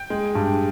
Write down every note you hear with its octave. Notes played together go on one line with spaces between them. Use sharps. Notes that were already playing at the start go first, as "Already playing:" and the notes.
Already playing: G5
G#3
G2